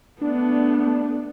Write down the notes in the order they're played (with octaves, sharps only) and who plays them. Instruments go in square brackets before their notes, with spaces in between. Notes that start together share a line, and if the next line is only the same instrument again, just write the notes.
[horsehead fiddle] A3 B3 [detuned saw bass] D4